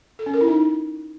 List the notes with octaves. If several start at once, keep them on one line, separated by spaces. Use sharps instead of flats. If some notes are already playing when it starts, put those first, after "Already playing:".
A4
C#4
A#4
E4
D#4